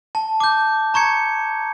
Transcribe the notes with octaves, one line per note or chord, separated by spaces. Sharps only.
A5
D6 G6
A#5 C#6 G#6 C#7